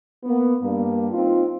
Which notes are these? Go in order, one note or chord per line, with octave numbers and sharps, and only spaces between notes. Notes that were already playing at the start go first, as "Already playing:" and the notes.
A#3 B3
G2 A#3
C4 D#4 F4